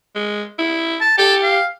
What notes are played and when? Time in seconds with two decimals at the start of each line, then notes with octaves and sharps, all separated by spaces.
0.16 G#3
0.59 E4
1.01 A5
1.18 G4 A4
1.43 F5